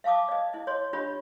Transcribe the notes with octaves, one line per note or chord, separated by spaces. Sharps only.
E5 F5 A5 D6 D#6
D5 D#5
E4 D#5
C#5 D#5 C6
D4 F4 G4 C#5 D#5 B5